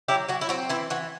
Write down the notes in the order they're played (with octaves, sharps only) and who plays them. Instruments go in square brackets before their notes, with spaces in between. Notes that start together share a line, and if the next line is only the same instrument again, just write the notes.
[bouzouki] F#3 E4 G4
F#3 F#4
E4
C4 F#4
E3 E4
E3 F#4